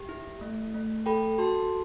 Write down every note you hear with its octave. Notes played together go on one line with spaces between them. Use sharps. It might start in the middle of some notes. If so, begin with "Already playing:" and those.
Already playing: G4
E4
A3
A3
A4 G5 B5
F#4 A5 C6